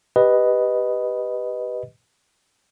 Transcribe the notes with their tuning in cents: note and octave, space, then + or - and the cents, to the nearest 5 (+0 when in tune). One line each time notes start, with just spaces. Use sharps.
G4 +0 B4 +0 D#5 +0